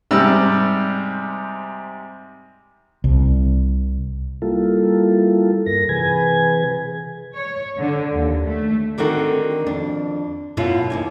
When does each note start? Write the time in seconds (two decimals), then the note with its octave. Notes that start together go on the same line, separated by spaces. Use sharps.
0.11 G#2 C3 G3 E6
3.04 C2
4.42 G3 A#3 E4 F4 A4
5.66 G2 A#4 A#6
5.89 C3 E3 G#4 B4 G#5 G#6
7.35 C#5
7.78 D3
8.12 D#2
8.45 A3
8.98 D3 D#3 C4 F#4 A4 A#4
9.66 F2 D4
10.57 F#2 B2 F#3 E4 F4
10.90 D#2 G#2 G#5